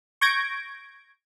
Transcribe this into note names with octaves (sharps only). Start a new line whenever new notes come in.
C#6 G6 G#6 A#6 D7